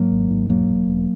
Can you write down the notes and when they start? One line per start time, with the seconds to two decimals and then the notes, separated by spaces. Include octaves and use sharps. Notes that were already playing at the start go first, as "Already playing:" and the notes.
Already playing: G#2 F#3 A#3
0.12 G#1
0.30 G#2
0.49 E1 F#3 A#3
0.69 E1
0.87 E1